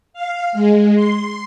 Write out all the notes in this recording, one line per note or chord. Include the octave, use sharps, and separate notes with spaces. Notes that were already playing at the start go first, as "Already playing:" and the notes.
F5
G#3
C6